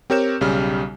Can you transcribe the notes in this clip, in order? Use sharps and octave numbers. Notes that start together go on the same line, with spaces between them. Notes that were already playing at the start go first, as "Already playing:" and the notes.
C4 G4 A#4 C#5 G6 E7
B1 C#3 G3 F6